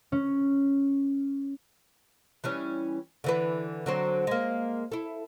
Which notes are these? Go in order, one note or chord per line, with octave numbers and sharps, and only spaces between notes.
C#4
E3 G3 C#4
D3 E3 B4
D3 F#3 C4
G#3 A#3
E4 A4